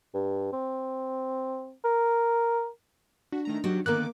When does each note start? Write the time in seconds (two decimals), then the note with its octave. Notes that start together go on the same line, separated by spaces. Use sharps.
0.14 G2
0.53 C4
1.84 A#4
3.33 D4 F#4
3.45 D#3 A3 A#5
3.64 D#3 F#3 F#4 G4 F#5
3.86 D3 D#3 A#3 B3 A#4 D6 F#6